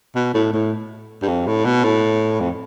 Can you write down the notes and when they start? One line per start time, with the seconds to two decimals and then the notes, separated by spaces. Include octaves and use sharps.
0.15 B2
0.34 A2
0.53 A2
1.22 G2
1.28 F2
1.47 A2
1.65 B2
1.84 A2
2.40 F2